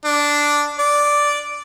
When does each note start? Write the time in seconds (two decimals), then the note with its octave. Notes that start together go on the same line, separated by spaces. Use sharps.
0.05 D4
0.79 D5